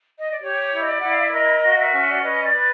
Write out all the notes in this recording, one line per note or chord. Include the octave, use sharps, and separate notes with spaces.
D#5
D5
G4 C#5
E4
D#5
D5
E4 F#5
F5
E5
A#4 D#5
F#4
F5
E5
C#4
D5
B4 D#5
D5
B4